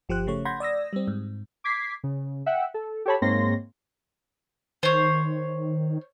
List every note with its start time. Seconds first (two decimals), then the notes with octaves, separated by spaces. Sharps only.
0.09 G1 F3 G4 C5 F#6
0.27 C#3 A3 C#5
0.45 F#5 B5 C6 G6 G#6 A#6
0.60 D5 D#6 E6 A#6
0.93 G3 C4
1.08 G#2
1.64 D6 G#6 B6 C7
2.03 C#3
2.46 E5 F#5 G5
2.74 A4
3.06 G4 A4 C#5 A5 B5
3.22 G#2 A#3 C4 C#5 C6 A#6
4.83 D#3 C5 C#5